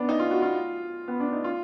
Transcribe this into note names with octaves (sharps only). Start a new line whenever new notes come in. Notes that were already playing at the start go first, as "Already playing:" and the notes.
Already playing: B3 D4
D#4
F4
F#4
F4
B3
D4
D#4
F4